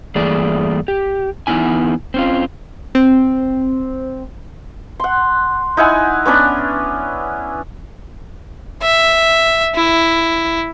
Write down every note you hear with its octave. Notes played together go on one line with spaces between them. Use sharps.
G2 E3 A3 A#3 G#4 D5
G4
E2 D3 B3 D#4 E4 G#5
C4 C#4 F4
C4
F#5 C6
D#4 E4 F#5 G#5
B3 C#4 D4 B4
E5
E4